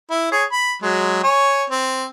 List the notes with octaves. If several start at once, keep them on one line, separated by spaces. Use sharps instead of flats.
E4
G#4 C#5
B5
F#3 G#3
C#5 G#5
C4